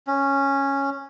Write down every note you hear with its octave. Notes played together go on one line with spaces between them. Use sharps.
C#4